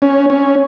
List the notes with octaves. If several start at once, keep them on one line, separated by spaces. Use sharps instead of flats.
C#4
C#4